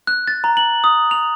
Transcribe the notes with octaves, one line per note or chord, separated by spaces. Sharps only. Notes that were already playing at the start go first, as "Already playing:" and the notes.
F#6
A6
A#5
F#7
D#6
F7